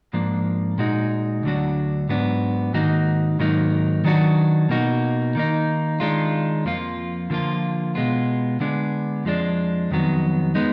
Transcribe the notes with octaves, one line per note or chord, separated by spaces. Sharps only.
G#2 F3 A#3 D4
A#2 G#3 D#4 F#4
D2 D3 F#3 D4 F#4
G#2 F#3 B3 D4
G#2 D#3 A#3 D#4 F#4
G#2 D#3 F#3 A#3 D#4
D#3 F#3 D4 F#4
B2 A#3 D#4 F#4
D#3 A#3 D#4
D#3 G#3 D4 F4
F2 F3 A#3 F4
D3 F3 A#3 F4
B2 G#3 B3 F4
D3 G#3 B3 D4
F2 F3 G#3 B3 D4
F2 D#3 F#3 B3
G#3 B3 D#4